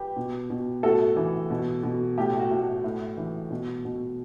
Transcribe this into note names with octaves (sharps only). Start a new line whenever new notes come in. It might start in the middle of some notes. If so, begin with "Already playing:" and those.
Already playing: G4 B4
B2
B2
A2 F#4 A4
E3
B2
B2
A2 G4
F#4
A2
F#4
A2
E3
B2
B2